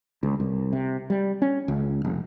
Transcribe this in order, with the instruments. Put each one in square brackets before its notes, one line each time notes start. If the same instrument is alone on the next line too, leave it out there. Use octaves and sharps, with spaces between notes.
[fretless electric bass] C#2
C2
C3
G3
C#4
C#2
F1